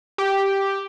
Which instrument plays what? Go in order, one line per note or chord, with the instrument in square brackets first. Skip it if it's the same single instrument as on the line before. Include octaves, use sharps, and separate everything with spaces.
[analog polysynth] G4